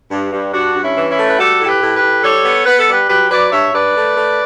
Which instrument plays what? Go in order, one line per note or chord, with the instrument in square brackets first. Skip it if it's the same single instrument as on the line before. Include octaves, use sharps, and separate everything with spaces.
[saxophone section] G2
G2
G2 D4 F#4
G2
C#4 E4
E3
C#4 E4
A3
B4
G3 F#4 A4
A2 A4
G4 B4
A2
G4 B4
A2
G3 A4 C#5
B3
B3 B4
A4
G3 G4 B4
F#3 G4 B4
F#3 B4 D5
G2 C#5 E5
G2 B4 D5
A3
A3